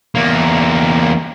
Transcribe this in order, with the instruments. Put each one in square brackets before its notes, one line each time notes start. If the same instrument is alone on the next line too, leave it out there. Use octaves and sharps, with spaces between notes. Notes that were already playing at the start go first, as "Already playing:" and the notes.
[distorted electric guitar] E2 A#3